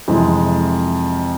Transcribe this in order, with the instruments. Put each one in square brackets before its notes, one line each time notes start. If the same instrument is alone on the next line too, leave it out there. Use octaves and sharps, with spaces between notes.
[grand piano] F2 C3 E3 G#3